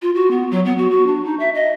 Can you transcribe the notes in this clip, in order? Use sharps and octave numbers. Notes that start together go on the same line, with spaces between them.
F4
F#4
B3
F#3
B3
F#4
F#4
D4
D#4
E5
D#5